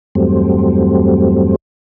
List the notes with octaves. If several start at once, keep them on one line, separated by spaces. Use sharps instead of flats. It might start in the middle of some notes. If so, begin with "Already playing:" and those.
E2 G2 F#3 G3 A3 C4